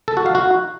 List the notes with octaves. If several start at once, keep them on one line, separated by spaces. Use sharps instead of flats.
A4
F#4
F5
F#4